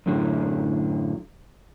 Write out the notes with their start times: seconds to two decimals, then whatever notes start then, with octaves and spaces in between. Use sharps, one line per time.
0.06 F#2 A2 D3 F#3